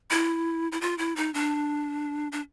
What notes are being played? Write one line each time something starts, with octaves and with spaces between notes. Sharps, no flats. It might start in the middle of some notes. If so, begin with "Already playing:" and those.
E4
E4
F4
E4
D#4
D4
D4